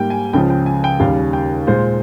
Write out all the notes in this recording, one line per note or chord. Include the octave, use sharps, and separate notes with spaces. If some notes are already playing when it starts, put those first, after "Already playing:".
Already playing: G#2 G3 A#3 G5
G#5
C#2 C#3 F3 G5
G5
G#5
G5
D#2 C#3 G3 F5
G5
A#2 G#3 C5